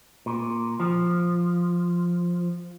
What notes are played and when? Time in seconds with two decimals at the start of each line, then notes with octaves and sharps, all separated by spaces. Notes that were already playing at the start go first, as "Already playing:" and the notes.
0.26 A#2
0.80 F3